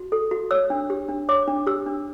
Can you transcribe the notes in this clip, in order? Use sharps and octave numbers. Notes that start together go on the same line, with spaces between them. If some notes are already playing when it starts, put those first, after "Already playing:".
Already playing: F#4
A4
F#4
C#5 E6
D4
G4
D4
C#5 D6
D4
G4 E6
D4